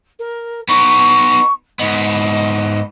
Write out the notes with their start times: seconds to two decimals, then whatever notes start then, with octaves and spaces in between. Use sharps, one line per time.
0.19 A#4
0.69 B3 D#4 C#6
1.79 G#2 B3 D#5